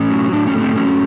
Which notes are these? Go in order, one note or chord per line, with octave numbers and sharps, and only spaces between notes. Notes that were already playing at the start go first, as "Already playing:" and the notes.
Already playing: A2 C#4
F#3
A2 D4
C#4
A3 B3
C4
F#3 C#4